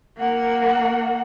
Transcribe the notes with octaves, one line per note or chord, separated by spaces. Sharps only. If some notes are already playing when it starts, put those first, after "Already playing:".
A#3 F#5